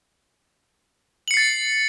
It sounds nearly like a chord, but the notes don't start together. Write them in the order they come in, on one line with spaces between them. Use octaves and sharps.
F#7 C#7 C7 A6